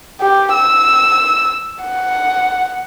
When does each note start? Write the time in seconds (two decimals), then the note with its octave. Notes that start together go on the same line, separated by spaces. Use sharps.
0.21 G4
0.53 E6
1.83 F#5